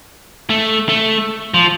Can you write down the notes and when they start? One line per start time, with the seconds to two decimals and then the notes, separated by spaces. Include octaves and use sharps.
0.50 A3
0.89 A3
1.54 F3